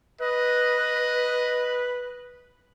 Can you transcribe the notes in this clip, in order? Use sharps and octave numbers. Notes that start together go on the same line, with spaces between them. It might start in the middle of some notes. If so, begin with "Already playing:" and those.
B4 D#5